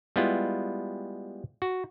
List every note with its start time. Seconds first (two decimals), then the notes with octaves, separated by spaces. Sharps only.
0.16 G3 G#3 B3 E4 F4
1.62 F#4